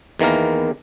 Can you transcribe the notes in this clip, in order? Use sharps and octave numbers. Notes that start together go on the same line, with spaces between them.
E2 D#3 E3 A#3 A#4